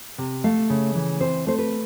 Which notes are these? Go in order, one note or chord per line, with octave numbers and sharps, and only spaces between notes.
C3
A3 F5
C#3
E3
C4 C5
A3 C5
B4